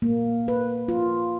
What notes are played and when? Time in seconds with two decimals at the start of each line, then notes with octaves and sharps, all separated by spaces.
0.02 A#3
0.48 B4
0.88 F4